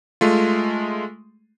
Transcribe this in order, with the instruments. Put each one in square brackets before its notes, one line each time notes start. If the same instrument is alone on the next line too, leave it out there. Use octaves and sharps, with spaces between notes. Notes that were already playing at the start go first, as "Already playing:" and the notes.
[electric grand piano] G#3 A3 F4